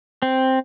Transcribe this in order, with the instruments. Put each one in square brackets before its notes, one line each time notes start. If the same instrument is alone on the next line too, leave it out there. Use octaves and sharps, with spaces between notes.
[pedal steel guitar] C4